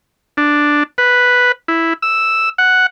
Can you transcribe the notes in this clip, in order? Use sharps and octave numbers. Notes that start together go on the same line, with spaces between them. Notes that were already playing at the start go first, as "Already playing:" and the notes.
D4
B4
E4
E6
F#5